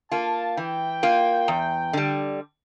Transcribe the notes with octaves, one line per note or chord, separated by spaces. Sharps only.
A#3 F4 A5
E3 G5
A#3 F4
E2
D3 G3